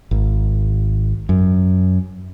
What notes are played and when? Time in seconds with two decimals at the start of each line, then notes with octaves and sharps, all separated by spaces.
0.11 G#1
1.29 F#2